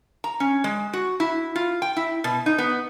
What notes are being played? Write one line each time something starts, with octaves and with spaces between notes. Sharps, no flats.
A#5
C#4
G#3
F#4
E4
F4
G5
E4
B2
D#4
B3